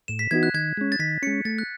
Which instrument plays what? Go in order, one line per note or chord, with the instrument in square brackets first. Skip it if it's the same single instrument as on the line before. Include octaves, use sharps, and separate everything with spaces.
[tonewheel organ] A2 [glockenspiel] E7
[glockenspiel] B6
[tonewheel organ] E3 B3 D#4 F#4 [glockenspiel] G#6
[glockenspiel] F#6
[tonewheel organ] D#3 [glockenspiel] G#6
[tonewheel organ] G#3 C#4
[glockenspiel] A6
[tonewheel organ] D#3 [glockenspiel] B6
[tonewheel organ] G#3 C#4 [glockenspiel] C#7
[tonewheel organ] A3 [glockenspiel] A6
[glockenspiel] F#6